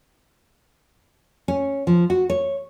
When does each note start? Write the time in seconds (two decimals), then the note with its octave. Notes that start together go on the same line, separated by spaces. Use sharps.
1.48 C#4
1.87 F3
2.10 F#4
2.30 C#5